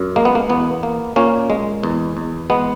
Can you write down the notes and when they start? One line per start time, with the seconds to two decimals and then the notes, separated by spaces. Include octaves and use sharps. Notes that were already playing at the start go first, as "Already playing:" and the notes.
Already playing: F#2
0.16 G#3 A#3
0.25 B3
0.35 A#3
0.49 E2 B3
0.83 A#3
1.16 A#2 A#3 C#4
1.50 G#3
1.83 E2
2.17 E2
2.50 G#3 B3